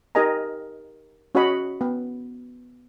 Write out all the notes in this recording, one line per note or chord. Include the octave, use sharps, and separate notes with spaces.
D#4 G4 A#4 D#5 G#5 A#5
C#4 F#4 C#5 D#5 F#5 B5
B3